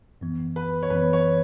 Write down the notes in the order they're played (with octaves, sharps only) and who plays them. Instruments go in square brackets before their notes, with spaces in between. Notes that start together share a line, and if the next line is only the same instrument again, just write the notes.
[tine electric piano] F#2 E3 B3
[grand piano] B4
C#5
[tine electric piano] F#2 E3 B3 [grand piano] B4
[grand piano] C#5